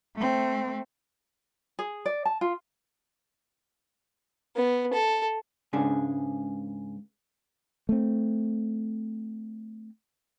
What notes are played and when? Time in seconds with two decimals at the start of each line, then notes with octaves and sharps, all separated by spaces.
0.16 A3 C4
1.79 G#4
2.06 D5
2.25 A5
2.41 F4
4.56 B3
4.93 A4
5.73 C#2 G#2 C#3 D4 G#4
7.89 A3 C4